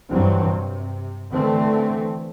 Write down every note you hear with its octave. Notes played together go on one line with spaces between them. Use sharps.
G2 E3 F#3 C4
C3
D3 E3 A3 C4